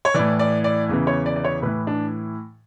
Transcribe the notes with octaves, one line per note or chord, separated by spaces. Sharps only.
C#5
A2 E3 D5
D5
D5
E2 C#3 E3
C#5
D5
D5
C#5
A2 E3 B4
D4